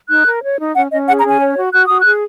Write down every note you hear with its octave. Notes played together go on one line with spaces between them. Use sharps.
D#4 F#6
A#4
C#5
D#4
C#4 F#5
C#4 D#5
G#4 F#5
A#5
C#4
G#5
C#5
F#4
F#4 F#6
F#4 D#6
F#6
G#4